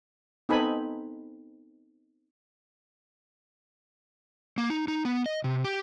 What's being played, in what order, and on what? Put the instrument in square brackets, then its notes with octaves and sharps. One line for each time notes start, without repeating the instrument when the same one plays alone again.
[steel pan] B3 C4 D#4 A4 G#5 B5
[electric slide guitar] A#3
D#4
D#4
B3
D#5
C3
G4